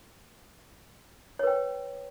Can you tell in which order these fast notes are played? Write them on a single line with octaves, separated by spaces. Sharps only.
C#5 B4 G5